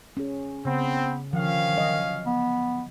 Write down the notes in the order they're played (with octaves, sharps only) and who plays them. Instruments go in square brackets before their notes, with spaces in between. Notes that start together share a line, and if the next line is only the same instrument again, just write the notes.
[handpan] C#4 G#4
[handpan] C#3 [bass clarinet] B3 [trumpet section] C4
[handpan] D3 F3 [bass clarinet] D#3 [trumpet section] C#4 F5
[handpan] F#3 D#5
[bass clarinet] B3